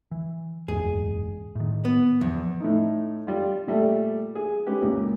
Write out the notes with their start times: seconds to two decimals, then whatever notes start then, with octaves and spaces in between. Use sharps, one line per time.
0.11 E3
0.68 F#1 E2 G#2 G#4
1.55 A2 D#3
1.85 B3
2.21 E2 E3 F3
2.60 A2 A3 D#4
3.27 G3 F4
3.67 A#2 G3 A3
4.35 G#4
4.66 G#3 C#4 G4 B4
4.82 C#2 A#2 A#3